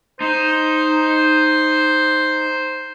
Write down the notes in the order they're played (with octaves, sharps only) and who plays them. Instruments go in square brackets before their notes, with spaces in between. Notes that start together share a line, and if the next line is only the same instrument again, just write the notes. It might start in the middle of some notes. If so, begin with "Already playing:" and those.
[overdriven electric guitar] D#4 [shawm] C5